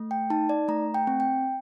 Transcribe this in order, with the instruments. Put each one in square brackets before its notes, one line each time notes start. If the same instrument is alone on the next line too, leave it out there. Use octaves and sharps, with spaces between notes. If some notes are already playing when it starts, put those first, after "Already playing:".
Already playing: [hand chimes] A3
G5
D#4 A5
D5
A3 A#5
G5
C4
G5